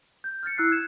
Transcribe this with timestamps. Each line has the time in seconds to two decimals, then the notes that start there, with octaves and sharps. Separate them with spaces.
0.24 G6
0.43 F6 G6 A6 C#7
0.57 E4 E6 F#6 A6 C7
0.70 F6 G#6 E7